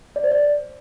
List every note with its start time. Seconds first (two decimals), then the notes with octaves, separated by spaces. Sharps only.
0.16 D5
0.24 C5
0.32 D5